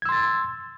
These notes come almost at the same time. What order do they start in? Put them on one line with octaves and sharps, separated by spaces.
G#6 E6 C6 A6